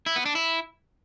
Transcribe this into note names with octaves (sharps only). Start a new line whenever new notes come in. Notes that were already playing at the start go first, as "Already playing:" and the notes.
E4
B3
D4
E4